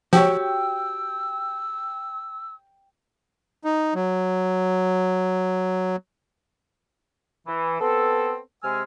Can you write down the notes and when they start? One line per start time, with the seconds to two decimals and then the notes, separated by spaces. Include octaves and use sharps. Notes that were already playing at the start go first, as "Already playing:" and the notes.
0.13 F3 F#4 G4 C#5 G5 E6
3.64 D#4
3.95 F#3
7.47 E3
7.81 B3 C4 A4
8.63 C3 G#3 G#5 E6 F6